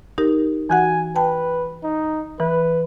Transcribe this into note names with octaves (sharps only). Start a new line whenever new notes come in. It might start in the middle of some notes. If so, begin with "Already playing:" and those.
D#4 G4 A#4
E3 F#4 F#5 G#5
B4 G5 A5
D#4
E3 B4